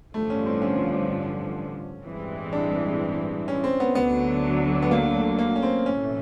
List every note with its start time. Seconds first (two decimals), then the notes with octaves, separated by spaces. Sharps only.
0.14 A1 G2 D3 F3 A3
0.30 C#4
0.46 C4
0.62 C#4
2.05 A1 G2 E3 G#3 C4
2.53 D4
3.48 C#4
3.64 C4
3.80 B3
3.95 D2 D3 F#3 B3
4.82 B3
4.91 A#3
5.15 A3
5.39 A#3
5.56 C#4
5.63 C4
5.86 B1 A2 E3 A3 C#4